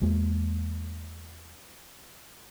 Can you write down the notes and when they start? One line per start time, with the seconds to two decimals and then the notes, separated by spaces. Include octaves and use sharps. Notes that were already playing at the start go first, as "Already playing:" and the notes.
0.02 E2 G#3 A#3